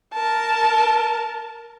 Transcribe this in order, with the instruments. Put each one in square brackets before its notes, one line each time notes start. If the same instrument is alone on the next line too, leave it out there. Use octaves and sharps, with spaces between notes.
[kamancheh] A#4 A5